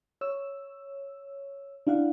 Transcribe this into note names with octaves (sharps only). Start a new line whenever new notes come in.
C#5 E6
D4 E4 F5 F#5